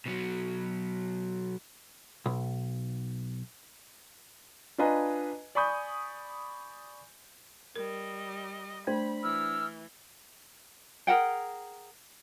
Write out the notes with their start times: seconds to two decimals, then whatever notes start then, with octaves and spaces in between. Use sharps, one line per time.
0.06 B2 F#3
2.26 B1
4.78 D4 F4 B4 D#5 G#5 A#5
5.55 D5 G#5 B5 C#6 D#6 G6
7.76 G3 A#4 D#5
8.87 A3 D4 C5 B5
9.24 E3 E6 F6
11.07 G#4 A#4 F#5 G5